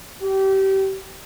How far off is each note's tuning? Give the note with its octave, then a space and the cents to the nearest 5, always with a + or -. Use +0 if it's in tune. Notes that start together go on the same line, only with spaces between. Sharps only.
G4 -25